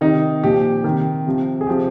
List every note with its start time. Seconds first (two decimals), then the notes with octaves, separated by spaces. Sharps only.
0.01 C3 D#3 D#4
0.43 A#2 F3 G4
0.84 C3 D#3
1.26 C3 F3
1.61 G#4
1.67 C3 F3 G4